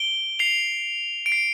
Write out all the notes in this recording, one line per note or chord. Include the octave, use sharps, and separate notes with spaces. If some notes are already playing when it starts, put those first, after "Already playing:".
Already playing: D7 G7
C7 F7
D7
C7